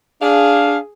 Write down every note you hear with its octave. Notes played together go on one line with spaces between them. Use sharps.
D4 G#4 F5